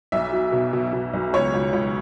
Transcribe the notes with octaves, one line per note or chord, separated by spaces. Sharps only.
B1 E5
F#3
B2
B2
B2
B1
C#2 C#5
C#2
C#2